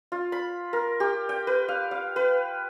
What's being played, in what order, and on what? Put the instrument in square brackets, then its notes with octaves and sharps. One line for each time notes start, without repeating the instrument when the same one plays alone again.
[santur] F4
B5
A#4
G4
G5
B4
F5
F5
B4